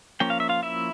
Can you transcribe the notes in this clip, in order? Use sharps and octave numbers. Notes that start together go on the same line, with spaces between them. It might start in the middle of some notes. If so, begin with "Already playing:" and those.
F3 A#3 C#4 G5
F5
E5
F4 F5
E4 E5